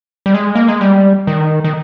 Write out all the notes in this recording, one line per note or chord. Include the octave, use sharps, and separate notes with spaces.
G3
G#3
A#3
G#3
G3
D#3
D#3